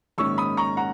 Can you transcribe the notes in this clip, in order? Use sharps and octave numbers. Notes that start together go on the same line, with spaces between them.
A#1 G#2 D#3 G#3 C#4 C#6 E6
B5 D#6
A#5 C#6
F#5 A#5